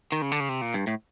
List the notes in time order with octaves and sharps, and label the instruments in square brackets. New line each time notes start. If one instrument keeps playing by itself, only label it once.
[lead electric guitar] D#3
C#3
D3
C#3
C3
A#2
G2
A2